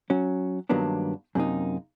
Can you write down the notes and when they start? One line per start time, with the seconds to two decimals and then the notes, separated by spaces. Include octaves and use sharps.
0.10 F#3 C#4
0.69 G2 D#3 F#3 A#3 B3 D4
1.35 F#2 C3 A#3 D#4